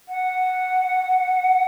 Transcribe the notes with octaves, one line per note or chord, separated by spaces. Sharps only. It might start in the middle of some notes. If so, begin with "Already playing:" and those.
F#5